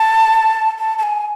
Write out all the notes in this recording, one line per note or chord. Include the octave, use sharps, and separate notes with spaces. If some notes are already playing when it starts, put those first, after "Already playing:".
Already playing: A5
A5
A5
G#5